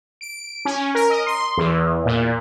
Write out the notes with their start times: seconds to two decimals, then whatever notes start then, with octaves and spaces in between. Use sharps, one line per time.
0.21 D7
0.65 C#4
0.95 A#4
1.10 D#5
1.27 C6
1.57 E2
2.06 A#2